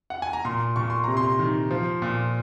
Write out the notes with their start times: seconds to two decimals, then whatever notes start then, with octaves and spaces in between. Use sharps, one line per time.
0.10 F#5
0.22 G#5
0.33 A#5
0.45 A#2 C6
0.76 A#2 C#6
0.90 C6
1.04 C3 A#5
1.17 C6
1.39 D#3
1.71 F3
2.02 A#2